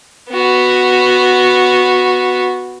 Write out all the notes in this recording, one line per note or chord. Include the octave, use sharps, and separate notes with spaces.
B3 F#4